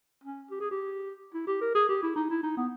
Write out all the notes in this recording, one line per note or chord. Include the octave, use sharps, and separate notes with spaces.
C#4
G4
G#4
G4
E4
G4
A#4
G#4
G4
E4
D#4
E4
D#4
B3